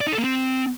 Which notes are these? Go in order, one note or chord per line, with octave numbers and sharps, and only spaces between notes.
D5
D#4
A4
A#3
C4